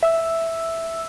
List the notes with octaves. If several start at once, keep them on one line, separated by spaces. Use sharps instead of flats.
E5 E6